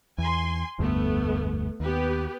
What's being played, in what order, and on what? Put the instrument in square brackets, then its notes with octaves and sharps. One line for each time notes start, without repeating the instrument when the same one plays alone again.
[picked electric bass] E2 [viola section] G#5 C6
[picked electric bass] F1 D2 G2 [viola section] A3 B3
[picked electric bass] D#2 [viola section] B3 G4 B4